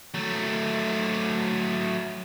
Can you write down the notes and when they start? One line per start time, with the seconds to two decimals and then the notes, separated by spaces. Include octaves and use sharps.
0.14 F#3 A3